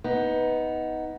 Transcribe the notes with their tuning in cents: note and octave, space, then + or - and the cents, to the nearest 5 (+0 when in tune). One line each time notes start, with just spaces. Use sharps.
B3 +0 D#4 +15